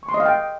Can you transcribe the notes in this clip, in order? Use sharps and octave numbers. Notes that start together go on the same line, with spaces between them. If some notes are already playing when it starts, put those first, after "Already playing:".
C#6
C6
D#5
F5
G5